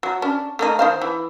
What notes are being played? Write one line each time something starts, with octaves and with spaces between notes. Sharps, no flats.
F#3
C#4 D4
A3 A#3 D#4
D#3 C5 F5
E3